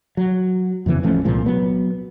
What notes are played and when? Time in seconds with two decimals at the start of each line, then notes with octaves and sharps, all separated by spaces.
0.17 F#3
0.86 F2 C#3 E3 B3
1.03 A1 F3 A3 C#4
1.25 C2 A#2 F3 G#3
1.46 F#3 B3